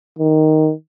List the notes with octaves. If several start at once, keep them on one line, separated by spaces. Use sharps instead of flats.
D#3